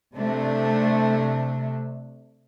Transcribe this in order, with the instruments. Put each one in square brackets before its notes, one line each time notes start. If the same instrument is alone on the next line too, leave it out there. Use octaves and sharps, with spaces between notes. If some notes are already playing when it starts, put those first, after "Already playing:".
[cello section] C3 A3 D4